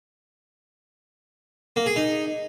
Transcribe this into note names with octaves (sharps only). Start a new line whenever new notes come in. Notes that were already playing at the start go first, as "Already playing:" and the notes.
A#3
G#4
D#4